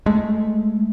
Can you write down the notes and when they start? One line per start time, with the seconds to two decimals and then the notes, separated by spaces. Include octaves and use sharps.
0.06 G#3 A3